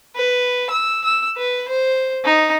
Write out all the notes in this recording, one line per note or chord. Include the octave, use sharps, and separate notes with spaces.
B4
E6
E6
B4
C5
D#4